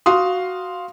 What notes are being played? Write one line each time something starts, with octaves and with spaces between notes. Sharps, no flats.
F#4 F5 C6 D#6